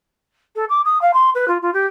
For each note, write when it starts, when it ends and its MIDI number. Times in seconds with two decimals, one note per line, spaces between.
0.56 0.65 69
0.69 0.81 86
0.85 1.01 87
1.02 1.11 77
1.14 1.30 84
1.35 1.46 71
1.48 1.58 65
1.62 1.73 65
1.74 1.86 67